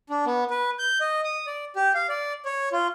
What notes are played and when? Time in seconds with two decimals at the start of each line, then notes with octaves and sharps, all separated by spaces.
0.10 D4
0.26 B3
0.50 B4
0.79 G6
1.01 D#5
1.24 D#6
1.47 D5
1.76 G4
1.94 F5
2.09 D5
2.45 C#5
2.72 F4